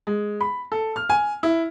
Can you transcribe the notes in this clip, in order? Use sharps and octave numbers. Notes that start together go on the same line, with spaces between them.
G#3
B5
A4
F6
G#5
E4